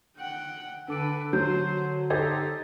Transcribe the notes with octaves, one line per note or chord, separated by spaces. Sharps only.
F#5 G5
D3 D4 A4 B4 D6 D7
F#3 C5 G6
D#4 G4 A4 C5 G#6 A6